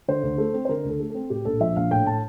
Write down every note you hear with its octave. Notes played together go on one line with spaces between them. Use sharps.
D3 C5
D2
A3
C4
C5
D3 A#4
D2 A4
A3
C4 A4
A2 G4
A#1 A4
F3 E5
A#1 F5
A2 G5
A5